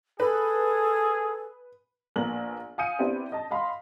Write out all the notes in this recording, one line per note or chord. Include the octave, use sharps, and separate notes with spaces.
G#4 A4 B4
A#1 A#3 B3 F#7
F5 G#5 D#6 G6 C#7 D#7
B3 C4 D4 E4 G4 D5
D#5 A5
D#5 F5 B5 C6